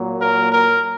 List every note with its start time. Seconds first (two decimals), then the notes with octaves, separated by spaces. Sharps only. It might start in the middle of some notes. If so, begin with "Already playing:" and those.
Already playing: A#2 F#3 A#3
0.22 A#4
0.52 A#4